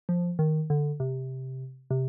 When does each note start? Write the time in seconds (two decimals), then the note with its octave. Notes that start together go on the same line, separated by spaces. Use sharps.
0.09 F3
0.39 D#3
0.70 D3
1.00 C3
1.91 C3